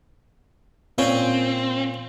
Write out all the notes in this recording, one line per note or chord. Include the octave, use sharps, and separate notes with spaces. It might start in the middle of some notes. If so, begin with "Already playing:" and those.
A#2 C4 C#4